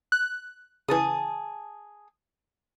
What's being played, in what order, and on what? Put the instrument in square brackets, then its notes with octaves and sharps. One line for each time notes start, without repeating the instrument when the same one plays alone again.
[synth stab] F#6
[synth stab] C#3 E3 [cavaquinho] G#4 A5 D#6